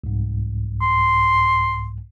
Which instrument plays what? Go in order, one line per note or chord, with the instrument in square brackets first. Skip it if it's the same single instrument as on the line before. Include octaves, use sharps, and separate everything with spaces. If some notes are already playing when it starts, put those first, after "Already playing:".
[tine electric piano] C2 G#2
[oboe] C6